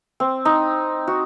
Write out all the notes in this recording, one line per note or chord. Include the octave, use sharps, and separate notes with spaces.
C4
D#4
F#4